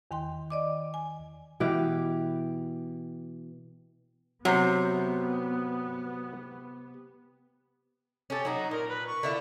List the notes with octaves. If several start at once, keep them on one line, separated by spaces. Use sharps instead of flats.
E2 D#3 G5 C6
D5 D#5 D6
G#5
B2 E3 G4
C3 F#3 B3 C5
C#4 G4 A4
F#3 D#4 F#4
A#2 A#4
B4
C#6
D3 E4 F4